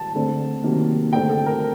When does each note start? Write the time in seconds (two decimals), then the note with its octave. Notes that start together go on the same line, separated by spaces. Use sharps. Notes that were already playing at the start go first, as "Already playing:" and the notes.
Already playing: A5
0.15 D3 A3 C4
0.64 C3 D#3 F#3 A#3
1.13 D3 A3 C4 G5
1.29 A4
1.46 A#4